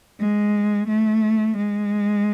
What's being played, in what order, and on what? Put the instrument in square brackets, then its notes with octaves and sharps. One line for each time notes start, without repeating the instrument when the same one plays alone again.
[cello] G#3
A3
G#3